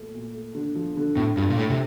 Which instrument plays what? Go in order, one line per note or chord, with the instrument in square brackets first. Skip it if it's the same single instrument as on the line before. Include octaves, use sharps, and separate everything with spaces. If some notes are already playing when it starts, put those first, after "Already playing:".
Already playing: [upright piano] A#2 A3
A#2
A3
D3
F3
D3
[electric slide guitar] A2 [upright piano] C4
[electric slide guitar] G2 [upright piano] F4
[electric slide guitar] A#2
[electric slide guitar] A2 [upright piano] A3
[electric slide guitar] C3